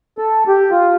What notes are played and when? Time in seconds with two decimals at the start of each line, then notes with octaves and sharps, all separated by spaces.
0.18 A4
0.48 G4
0.71 F4